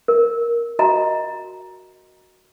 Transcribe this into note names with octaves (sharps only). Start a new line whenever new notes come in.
A#4
F#4 D#5 A#5